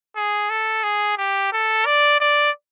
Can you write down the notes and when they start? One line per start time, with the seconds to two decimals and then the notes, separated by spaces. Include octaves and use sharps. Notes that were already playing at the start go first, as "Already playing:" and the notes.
0.16 G#4
0.50 A4
0.83 G#4
1.17 G4
1.52 A4
1.86 D5
2.20 D5